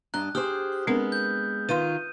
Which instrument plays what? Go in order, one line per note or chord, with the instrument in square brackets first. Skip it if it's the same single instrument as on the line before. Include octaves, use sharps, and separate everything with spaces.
[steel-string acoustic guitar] G2 D4 D#5 [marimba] A#5 [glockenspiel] F#6
[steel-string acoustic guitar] G4 G#4 C5 [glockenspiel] D#6 F6
[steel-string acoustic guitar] G#3 B3 [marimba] C4 D4 A#4
[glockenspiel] G6
[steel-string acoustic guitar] D#3 F4 [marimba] B4 F5 C6 [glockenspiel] D#7